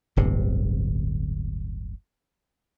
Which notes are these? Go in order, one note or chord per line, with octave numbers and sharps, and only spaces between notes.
D1 G1 C3